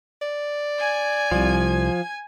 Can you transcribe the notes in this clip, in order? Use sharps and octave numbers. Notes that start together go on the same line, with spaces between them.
D5
G#5 G#6
C2 F3